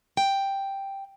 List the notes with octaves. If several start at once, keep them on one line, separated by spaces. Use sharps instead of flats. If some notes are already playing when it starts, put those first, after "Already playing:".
G5